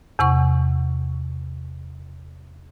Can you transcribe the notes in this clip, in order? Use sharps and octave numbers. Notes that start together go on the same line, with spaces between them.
E2 C3 F#5 C#6